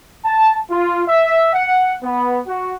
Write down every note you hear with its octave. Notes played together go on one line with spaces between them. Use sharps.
A5
F4
E5
F#5
B3
F#4